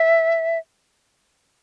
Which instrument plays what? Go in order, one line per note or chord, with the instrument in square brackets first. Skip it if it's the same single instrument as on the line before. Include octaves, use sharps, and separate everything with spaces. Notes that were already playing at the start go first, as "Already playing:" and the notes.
Already playing: [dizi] E5